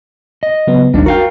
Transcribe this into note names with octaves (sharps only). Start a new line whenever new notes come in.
D#5
C#3 F#3 B3
G#1 D#2 G3 D4 D#4
F#4 A#4 F5 G5